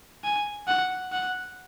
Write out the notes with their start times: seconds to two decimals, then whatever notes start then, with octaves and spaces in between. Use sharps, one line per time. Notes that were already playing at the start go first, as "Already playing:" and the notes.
0.24 G#5
0.68 F#5
1.12 F#5